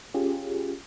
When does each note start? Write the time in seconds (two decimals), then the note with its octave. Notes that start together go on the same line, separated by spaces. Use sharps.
0.14 C#4 F4 G4 G#4